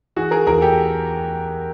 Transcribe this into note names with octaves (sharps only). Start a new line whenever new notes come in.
E3 F#4 G#4
G#4 A#4
E2 G#4 A#4
G4 A4